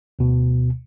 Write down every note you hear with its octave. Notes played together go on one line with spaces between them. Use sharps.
D2 B2